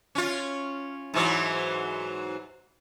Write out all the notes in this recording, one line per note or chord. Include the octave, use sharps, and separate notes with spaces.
C#4 F4
G#2 E3 F#3